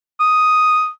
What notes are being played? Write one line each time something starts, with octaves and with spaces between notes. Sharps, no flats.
D#6